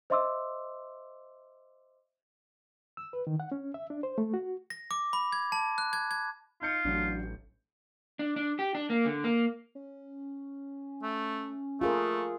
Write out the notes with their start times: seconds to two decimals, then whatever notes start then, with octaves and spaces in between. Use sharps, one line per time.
0.10 C5 D#5 E5 C6 D6 E6
2.97 E6
3.13 B4
3.27 D#3
3.40 F#5
3.52 C#4
3.74 E5
3.90 D4
4.03 C5
4.18 A3
4.34 F#4
4.70 A#6
4.91 D6
5.13 B5
5.32 G#6
5.52 A5
5.78 F#6
5.93 G#6
6.11 G#6
6.62 D#4 F4 G6 C#7
6.85 A1 F#3 D4
8.19 D4
8.36 D4
8.59 G4
8.75 D4
8.90 A#3
9.05 D3
9.24 A#3
9.75 C#4
11.03 A3
11.81 A3 F4 G#4 A#4